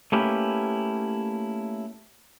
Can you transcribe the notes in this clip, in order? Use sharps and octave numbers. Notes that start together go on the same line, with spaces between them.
A3 A#3 C#4 E4 G4 B4